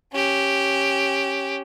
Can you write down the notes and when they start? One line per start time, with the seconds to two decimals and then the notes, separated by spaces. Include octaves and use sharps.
0.13 C#4 G4